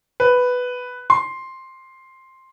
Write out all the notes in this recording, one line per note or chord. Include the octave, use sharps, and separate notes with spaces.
B4
C6